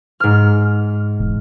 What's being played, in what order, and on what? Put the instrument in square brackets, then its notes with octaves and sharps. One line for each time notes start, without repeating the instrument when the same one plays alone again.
[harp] G#2 F6
[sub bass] E1